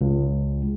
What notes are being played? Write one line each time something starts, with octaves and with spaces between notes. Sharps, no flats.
C#2